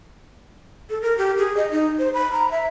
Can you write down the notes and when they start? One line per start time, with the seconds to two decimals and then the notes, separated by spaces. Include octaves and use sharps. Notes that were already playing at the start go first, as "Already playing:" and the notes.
0.90 A4
1.02 A#4
1.18 G4
1.37 G#4
1.57 D#5
1.71 D#4
1.99 C5
2.14 B5
2.33 A#5
2.51 E5